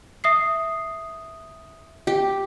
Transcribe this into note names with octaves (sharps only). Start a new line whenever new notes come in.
E5 D#6 C7
G4